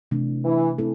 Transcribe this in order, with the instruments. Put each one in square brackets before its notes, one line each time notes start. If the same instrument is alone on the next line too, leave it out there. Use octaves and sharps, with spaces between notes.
[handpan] C3 E3 A3 D4
[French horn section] E3
[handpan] A3 C4 E4 A4